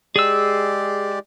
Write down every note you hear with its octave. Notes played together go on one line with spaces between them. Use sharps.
G#3 G4 G#4 D5 E6